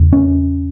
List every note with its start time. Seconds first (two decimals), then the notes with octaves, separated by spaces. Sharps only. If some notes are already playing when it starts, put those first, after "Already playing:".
Already playing: E2 C#3
0.13 C#4